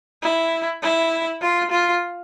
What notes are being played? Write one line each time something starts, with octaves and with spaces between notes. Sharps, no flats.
E4
E4
F4
F4